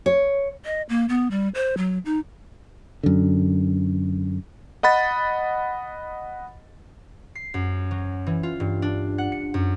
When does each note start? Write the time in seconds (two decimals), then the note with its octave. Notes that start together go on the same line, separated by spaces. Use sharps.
0.06 C#5
0.65 D#5
0.89 A#3
1.09 B3
1.31 G3
1.55 C5
1.77 F#3
2.05 D#4
3.03 F#2 D3
4.83 D#5 F#5 B5 A6
7.35 C7
7.54 F#2
7.91 F#3
8.27 E3
8.43 F4
8.60 G2
8.82 D4
9.18 F#5
9.32 C#7
9.54 F#2